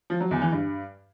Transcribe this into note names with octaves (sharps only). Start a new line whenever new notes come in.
F3
F#3
E2
E3
G2